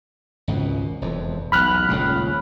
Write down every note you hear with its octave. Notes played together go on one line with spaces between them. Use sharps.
G#1 C#2 B2
E1 F2
B1 E2 B5 F6 F#6
D#1 C#2 C#3